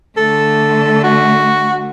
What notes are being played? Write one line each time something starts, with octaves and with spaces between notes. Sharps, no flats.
D3 A3 A4
F#4